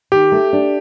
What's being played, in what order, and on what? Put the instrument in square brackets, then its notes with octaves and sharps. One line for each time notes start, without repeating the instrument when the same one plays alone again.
[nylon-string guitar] D#3 [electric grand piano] G4
[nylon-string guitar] A3
D4